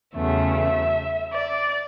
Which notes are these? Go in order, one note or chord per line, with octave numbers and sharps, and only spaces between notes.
E2 C#3 F#3 A3 E5
D5